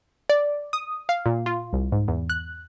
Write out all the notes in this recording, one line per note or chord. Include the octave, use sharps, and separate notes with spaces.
D5
D#6
F5
A#2
F4
C2
G#2
E2
F#6